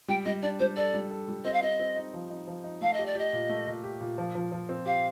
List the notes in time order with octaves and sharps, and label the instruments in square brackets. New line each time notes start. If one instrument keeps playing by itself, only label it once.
[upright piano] G3 [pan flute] G5
[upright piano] G3 [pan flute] D#5
[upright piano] D4 [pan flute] D5
[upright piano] G3 [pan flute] C5
[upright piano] A4 [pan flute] D5
[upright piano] G3
A4
G3
[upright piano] C4 [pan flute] D#5
[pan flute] F5
[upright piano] C4 [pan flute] D#5
[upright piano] C4
D#4
F3
D#4
F3
D#4
[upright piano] A3 [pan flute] F5
[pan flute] D#5
[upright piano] G4
[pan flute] D5
[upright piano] G4 [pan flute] D#5
[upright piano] A#2
A3
A#2
G4
A#2
F3
F3
F3
C4
[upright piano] G4 [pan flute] F5